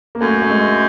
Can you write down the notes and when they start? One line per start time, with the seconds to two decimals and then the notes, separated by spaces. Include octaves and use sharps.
0.15 A#3
0.21 F#2 A3
0.42 A3
0.50 G#3